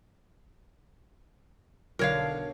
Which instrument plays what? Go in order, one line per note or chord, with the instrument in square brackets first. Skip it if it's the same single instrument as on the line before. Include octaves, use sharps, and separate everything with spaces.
[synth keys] B1 D3 [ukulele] A#4 C#5 F5